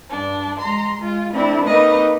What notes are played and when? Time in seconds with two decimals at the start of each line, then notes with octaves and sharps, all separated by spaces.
0.10 G2 D4
0.60 G#3 A#5 C6
0.98 G#3 F4
1.33 A3 C4 D4 E4
1.65 A#3 C4 D#4 B4 D#5